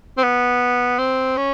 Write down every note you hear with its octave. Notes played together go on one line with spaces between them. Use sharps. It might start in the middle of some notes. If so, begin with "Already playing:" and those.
C4
B3
C4
C#4